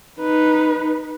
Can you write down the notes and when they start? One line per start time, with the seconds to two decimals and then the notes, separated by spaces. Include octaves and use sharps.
0.19 D#4 B4